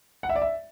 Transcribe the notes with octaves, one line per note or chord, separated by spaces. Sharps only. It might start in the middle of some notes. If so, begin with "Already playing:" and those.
F#5
E5
D5
E5